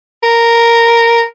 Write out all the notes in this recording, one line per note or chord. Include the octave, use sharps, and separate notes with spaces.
A#4